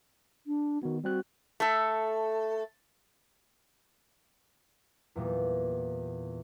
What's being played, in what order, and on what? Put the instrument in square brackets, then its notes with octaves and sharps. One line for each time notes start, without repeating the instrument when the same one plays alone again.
[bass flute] D4
[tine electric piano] D#3 B3 [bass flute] F#4
[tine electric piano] G3 C4 F#6 [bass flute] F#4
[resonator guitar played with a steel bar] A3 A4
[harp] E2 A#2 G3